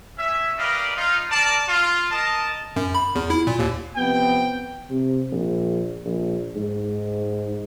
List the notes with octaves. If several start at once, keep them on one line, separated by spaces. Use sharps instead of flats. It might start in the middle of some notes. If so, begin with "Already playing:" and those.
C#4 E5
G4 A#4 B4 D5 D#5 F5
D#4 F4
A#4 D5 A5
F4
A#4 D#5 A5
F#2
B5
E2
E4
A#2
D#2
F2 C3 B3 G5
C3
A#1
A#1
G#2